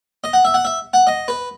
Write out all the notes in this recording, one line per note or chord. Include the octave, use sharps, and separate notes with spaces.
D#5
F#5
E5
F#5
E5
F#5
D#5
B4